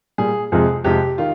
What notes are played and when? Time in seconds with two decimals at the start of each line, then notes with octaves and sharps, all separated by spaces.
0.18 A#2 G3 G#4
0.52 F2 C3 F3 G#3 G#4
0.84 F2 C3 F3 G#3 G4
1.18 D#3 F4